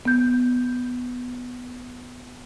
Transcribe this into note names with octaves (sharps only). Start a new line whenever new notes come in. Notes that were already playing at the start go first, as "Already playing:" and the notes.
B3 G6